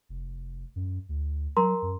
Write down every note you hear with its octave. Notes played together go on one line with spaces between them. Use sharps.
F1
F#2
D2
F#3 A#4 A#5 C6
F#2